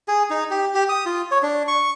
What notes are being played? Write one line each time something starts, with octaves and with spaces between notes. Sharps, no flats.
G#4
D#4
G4
G4
D#6
F4
C#5
D4
C#6